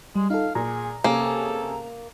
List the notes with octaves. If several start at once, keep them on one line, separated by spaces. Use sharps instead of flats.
G3 G#3
D#4 F4 A4 F5
A#2 G#4 A#5
C3 A#3 C#4 G#4 A4